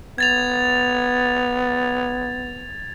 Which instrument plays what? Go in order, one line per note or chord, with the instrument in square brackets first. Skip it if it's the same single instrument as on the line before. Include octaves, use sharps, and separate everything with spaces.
[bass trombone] B3 [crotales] G#6 A6 F7